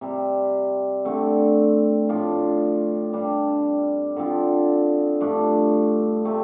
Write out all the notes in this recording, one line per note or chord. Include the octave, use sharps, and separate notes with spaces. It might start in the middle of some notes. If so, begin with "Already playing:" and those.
C3 G3 C4
D3 A3 C4
A2 F3 D4 F4
G2 G3 D4
D3 F3 C4 F4
G2 F3 A3 D4
C3 A3 C4